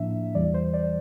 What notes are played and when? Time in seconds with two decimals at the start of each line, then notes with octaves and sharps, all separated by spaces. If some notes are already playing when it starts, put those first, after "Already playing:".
Already playing: A2 F3 A#3 D4 E5
0.35 E2 E3 G3 D5
0.54 C5
0.74 D5